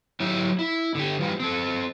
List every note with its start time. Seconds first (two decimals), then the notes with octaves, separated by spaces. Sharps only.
0.20 F#3 E4 G4 E5
0.59 E4
0.95 D3 G4
1.19 E3 F3 G3
1.40 C4 A4